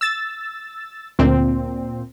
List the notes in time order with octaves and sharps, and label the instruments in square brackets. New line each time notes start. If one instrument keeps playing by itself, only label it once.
[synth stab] E6 A6
[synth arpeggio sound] D2 [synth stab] A#2 C4